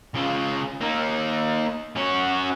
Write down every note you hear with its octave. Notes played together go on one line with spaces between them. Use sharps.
C#3 F4
A#3 D#4
C#4 F#4